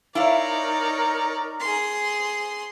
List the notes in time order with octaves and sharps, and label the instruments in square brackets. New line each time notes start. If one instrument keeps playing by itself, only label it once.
[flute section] D#4 A#4 A#5 [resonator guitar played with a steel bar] E4 F5 [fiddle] C#5 D5
[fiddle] G#4 C6